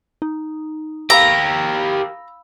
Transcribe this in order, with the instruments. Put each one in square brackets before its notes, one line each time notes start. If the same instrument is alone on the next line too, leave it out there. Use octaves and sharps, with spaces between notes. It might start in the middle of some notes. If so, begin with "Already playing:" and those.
[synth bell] D#4
[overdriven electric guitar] G4 A#4 [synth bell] F5 B5 E6 [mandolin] A#5